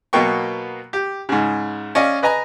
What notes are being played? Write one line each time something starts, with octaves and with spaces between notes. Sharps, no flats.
B2 F#3 A#3 B3 G5 C#6
G4
G#2 C#3
C#4 D5 D#5 F5 G#5
B4 D#5 G#5 A#5